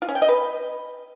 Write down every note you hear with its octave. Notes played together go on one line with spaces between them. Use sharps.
F4
C#4
G5
D#5
B4